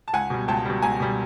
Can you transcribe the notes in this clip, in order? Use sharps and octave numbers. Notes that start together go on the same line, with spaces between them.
A5
C#2 F#5 G#5
B2 G3
C#2 G5 A5
B2 G3
C#2 G#5 A#5
B2 G3